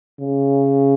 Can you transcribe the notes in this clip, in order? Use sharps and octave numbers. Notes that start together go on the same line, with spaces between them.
C#3